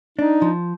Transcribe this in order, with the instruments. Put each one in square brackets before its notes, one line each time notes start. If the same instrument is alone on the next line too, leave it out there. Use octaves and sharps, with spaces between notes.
[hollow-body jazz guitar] D4 [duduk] D#4
[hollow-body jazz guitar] F3